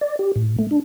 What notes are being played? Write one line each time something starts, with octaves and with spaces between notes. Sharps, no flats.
D5
G4
A2
A3
D4